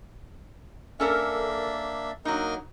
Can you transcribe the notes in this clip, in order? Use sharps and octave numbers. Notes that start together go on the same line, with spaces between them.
A#3 C#4 D4 A4 A#4 E5
F#3 A#3 D#4 A#4 D#5